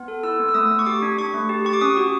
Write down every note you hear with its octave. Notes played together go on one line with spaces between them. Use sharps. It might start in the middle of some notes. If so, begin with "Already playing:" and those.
Already playing: B3
A4
E4 E6
B3
E6
A3 D#6
A3
C#6
G4 D6
D4
D4 C#6
A3
G4
G4 C#6
D6
C#4 D#6
F#4